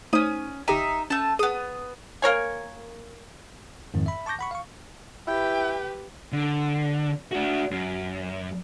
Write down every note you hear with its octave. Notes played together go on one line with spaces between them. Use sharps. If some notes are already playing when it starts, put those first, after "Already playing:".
A3 C#4 D#4 C5 D#6
G1 D#4 G4 E5 G5
A3 C#4 A5
B3 G#4 D#6
A#3 A#4 C#5 G#5
F2 G#2 D#3 C4
E5 B5
A5 C#6 D6 G6 A#6
F#5 B5 C#6
F5 C#6
E4 G4 B4 G5
D3
D4 F#4
F#2